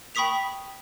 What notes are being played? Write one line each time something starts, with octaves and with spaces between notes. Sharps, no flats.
G5 B5 C#6 D#6 B6 F7